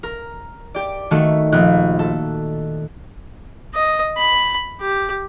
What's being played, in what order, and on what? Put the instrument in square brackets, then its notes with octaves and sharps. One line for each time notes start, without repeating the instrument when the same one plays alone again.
[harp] A#4
G4 D5
D#3 A3 F#4 A4
A#1 F#6
A4
[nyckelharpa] D#5
B5
G4